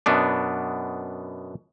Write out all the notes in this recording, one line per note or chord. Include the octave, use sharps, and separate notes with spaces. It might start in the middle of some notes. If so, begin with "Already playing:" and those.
F#2 B2 B3 D4